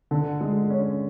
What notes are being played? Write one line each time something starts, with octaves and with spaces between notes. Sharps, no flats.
D3
G#3
C#4